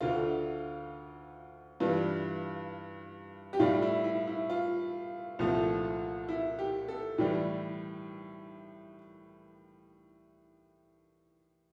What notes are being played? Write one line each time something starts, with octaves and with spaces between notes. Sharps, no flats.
D2 D3 A3 F4
G2 E3 G3 F4
G4
A2 G3 F4
E4
E4
E4
F4
C2 A#2 F3 A3
E4
G4
A4
A2 E3 G3 G4